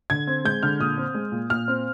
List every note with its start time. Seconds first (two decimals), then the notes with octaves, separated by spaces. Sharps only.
0.10 D3 G#6
0.27 C4
0.45 G#3 G6
0.63 D3 F6
0.79 A#2 D#6
0.98 C4
1.15 G#3
1.32 A#2
1.50 A#2 F6
1.68 C4